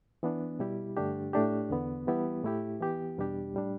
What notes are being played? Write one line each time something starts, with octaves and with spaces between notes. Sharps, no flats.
E3 B3 D4
B2 G3 E4 G4
G2 D3 A3 D4 G4
A2 A3 D4 G4
E2 D3 B3
E3 G3 B3 E4 G4
A2 A3 E4 G4
E3 B3 G4
E2 B2 G3 D4 G4
A2 G3 D4